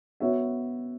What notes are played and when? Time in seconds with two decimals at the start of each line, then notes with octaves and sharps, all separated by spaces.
0.20 B3 F#4 C#5 E5